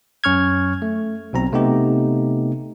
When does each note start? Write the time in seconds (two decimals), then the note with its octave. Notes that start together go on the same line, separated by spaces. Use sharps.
0.24 F#2 C#4 C#6 F6 G#6
0.82 A3
1.33 B1 B2 C4 A#5
1.52 C3 A3 B3 D#4 G4